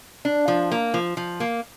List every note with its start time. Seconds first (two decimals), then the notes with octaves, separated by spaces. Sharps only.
0.25 D4
0.48 F3
0.72 A#3
0.94 F3
1.17 F3
1.40 A#3